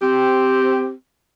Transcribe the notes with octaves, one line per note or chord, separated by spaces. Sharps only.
C4 G4